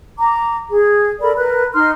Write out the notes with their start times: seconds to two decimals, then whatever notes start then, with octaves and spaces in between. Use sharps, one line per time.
0.18 A#5 D6
0.71 G#4
1.21 A4 A#4 D5 B5
1.37 A#4 B4 F#6
1.73 D#4 C6 F6